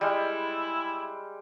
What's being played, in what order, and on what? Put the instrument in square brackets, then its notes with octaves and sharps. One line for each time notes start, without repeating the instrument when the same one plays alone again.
[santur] G3 G#3 [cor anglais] E4